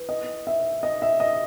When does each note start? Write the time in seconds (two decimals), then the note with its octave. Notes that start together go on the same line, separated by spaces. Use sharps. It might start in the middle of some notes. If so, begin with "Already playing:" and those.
Already playing: E3
0.09 D#5
0.47 E5
0.83 D#5
1.02 E5
1.20 D#5